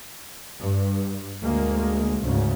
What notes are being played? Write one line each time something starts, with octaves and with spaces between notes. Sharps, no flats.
G2
D2 G#3 A#3
D2 G#2 C#3